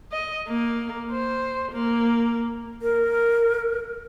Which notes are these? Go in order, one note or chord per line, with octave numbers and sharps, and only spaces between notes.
D#5
A#3
C5
A#3
A#4